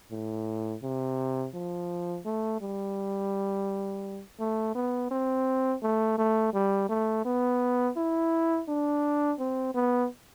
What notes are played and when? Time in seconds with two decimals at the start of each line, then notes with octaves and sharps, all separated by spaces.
0.11 A2
0.83 C3
1.54 F3
2.25 A3
2.61 G3
4.40 A3
4.75 B3
5.11 C4
5.82 A3
6.18 A3
6.54 G3
6.89 A3
7.25 B3
7.97 E4
8.68 D4
9.39 C4
9.74 B3